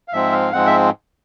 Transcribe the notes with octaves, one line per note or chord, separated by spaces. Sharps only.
F5
G#2 F3 G#3 C4 E5
F5
G#2 F3 G#3 C4 F#5
E5